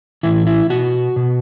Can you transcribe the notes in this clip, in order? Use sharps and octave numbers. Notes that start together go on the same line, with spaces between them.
A2 E3 E4
E4
B2 F#4
B2